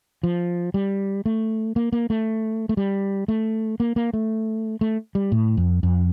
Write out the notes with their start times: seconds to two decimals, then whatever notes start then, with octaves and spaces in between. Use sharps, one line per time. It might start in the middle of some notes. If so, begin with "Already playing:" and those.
0.23 F3
0.74 G3
1.26 A3
1.76 A#3
1.92 A#3
2.10 A3
2.69 A3
2.77 G3
3.28 A3
3.80 A#3
3.96 A#3
4.14 A3
4.81 A3
5.15 G3
5.32 A2
5.57 F2
5.83 F2